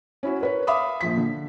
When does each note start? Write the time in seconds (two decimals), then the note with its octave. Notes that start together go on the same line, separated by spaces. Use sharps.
0.23 C#4 E4 F#4
0.41 A#4 B4 C#5
0.67 E5 F5 B5 D6 D#6
1.01 A#1 F3 B6
1.17 D3